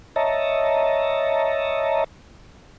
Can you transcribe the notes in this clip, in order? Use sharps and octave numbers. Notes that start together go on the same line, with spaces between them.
C#5 D#5 E5 A5 A#5